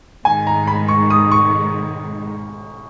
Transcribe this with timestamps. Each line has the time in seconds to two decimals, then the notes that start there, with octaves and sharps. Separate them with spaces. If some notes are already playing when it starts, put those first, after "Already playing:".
0.25 G#2 D#3 G#3 G#5
0.47 A#5
0.67 B5
0.88 C#6
1.10 D#6
1.32 C#6